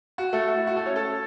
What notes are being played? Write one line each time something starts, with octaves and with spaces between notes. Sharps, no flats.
F#4
A3 A4
F#4
E4
F#4
A3 A4
C#4 C#5
A4 A5